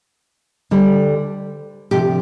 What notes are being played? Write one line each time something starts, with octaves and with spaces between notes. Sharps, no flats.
D2 D3 G3
D2 C3 F3 G4